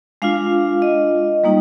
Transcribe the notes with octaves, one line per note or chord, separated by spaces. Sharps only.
G#3 D4 F4 F5
D#5
G3 A#3 D#4